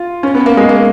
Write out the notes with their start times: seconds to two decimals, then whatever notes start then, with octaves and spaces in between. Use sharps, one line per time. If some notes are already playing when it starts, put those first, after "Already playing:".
Already playing: F4
0.23 C#4
0.35 B3
0.46 A#3
0.57 G#3
0.69 A#3